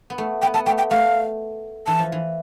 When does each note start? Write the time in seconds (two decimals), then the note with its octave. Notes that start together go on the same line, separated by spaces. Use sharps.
0.10 B3
0.18 A3
0.42 B3 G5
0.54 B3 A5
0.66 A3 G5
0.78 G5
0.90 A3 F5
1.87 E3 A5
1.99 F3
2.12 E3